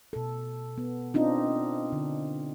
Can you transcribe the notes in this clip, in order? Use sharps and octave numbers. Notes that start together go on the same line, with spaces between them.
B2 A4
B3
C4 D4 D#4 F4
D3